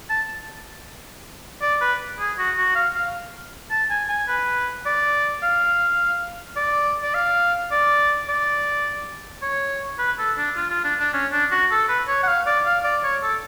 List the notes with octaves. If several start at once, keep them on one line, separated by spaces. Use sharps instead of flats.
A5
D5
B4
G#4
F#4
F#4
F5
F5
A5
G#5
G#5
B4
D5
F5
D5
D5
F5
D5
D5
C#5
B4
A4
D4
F4
F4
D4
D4
C#4
D4
F#4
A4
B4
C#5
F#5
F5
D5
F5
D5
C#5
A4